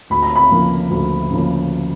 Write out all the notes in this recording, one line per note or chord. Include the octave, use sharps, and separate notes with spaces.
D2 B5
A#5
B5
C#3 F3 A#3
D2
C#3 F3 A#3